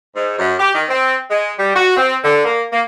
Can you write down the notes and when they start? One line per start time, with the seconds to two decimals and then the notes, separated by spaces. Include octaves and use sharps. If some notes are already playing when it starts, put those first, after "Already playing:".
0.15 G#2
0.38 F#2
0.58 G4
0.74 D#3
0.88 C4
1.30 G#3
1.58 G3
1.75 F#4
1.96 C4
2.24 D3
2.44 A#3
2.72 A#3